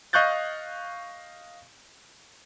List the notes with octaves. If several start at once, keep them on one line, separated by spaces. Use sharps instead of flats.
D#5 F5 C#6 F#6 G6 A6